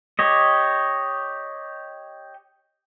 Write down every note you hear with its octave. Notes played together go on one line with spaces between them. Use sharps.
G4 C#5 D#5